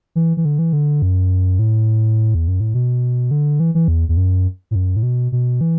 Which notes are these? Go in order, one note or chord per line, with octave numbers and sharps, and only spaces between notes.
E3
E3
D3
E3
D3
F#2
A2
E2
F#2
A2
B2
D3
E3
E3
E2
E2
F#2
A2
F#2
A2
B2
B2
E3